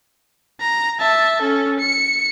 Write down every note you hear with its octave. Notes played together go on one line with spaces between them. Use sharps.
A#5
E5 A5
C#4 A4
C#7